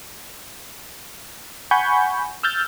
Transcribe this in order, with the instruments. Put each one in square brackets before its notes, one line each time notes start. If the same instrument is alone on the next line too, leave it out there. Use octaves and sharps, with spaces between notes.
[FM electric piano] F#5 G#5 B5 C#6 G6
E6 F6 G6 A6